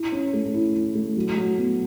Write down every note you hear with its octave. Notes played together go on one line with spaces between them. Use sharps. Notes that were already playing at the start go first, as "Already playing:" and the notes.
Already playing: E4
C#4
A3
E4
E4
A3
F#3
F#3
B3